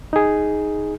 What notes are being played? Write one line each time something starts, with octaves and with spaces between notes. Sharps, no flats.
D#4 G#4